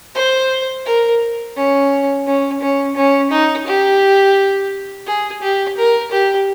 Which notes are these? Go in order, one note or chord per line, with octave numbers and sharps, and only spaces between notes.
C5
A#4
C#4
C#4
C#4
C#4
D#4
G4
G#4
G4
A#4
G4